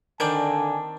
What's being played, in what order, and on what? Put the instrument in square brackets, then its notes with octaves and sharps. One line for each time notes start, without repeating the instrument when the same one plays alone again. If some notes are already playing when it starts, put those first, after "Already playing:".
[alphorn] D3 [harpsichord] D#3 D5 [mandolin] C4 D4 G6 [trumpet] G#5